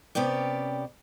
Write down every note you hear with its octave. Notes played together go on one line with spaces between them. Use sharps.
C3 B3 C#4 G4 D5